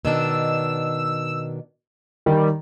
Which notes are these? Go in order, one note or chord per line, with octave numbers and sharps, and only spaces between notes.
B2 D#3 D4 E6
D#3 G3